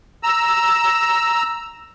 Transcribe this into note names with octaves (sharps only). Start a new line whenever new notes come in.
A#5 E6